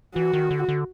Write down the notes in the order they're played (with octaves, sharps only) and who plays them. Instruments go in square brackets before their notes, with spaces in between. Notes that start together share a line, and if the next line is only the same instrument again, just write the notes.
[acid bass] E3 [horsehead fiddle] F#4
[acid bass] D#3
D3
D3